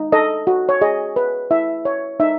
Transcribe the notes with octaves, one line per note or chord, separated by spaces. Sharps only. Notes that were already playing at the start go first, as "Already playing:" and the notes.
Already playing: D#4
A4 D#5
F#4
C#5
G#4 D#5
B4
E4 E5
C#5
D#4 E5